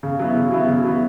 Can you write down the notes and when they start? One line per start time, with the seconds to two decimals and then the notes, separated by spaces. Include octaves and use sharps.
0.03 C#3
0.19 F#3 B3 E4
0.36 C#3
0.52 F#3 B3 E4
0.68 C#3
0.84 F#3 B3 E4